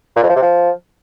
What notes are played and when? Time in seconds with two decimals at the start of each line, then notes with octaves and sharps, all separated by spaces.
0.16 A#2
0.23 F2
0.29 F3
0.36 C3
0.42 F3